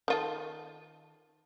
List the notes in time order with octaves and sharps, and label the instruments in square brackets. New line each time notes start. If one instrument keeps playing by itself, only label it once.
[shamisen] D#3 F4 A4